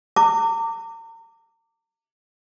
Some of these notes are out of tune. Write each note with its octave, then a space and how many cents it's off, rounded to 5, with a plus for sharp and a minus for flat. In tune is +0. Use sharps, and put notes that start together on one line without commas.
A#5 -40 D6 +0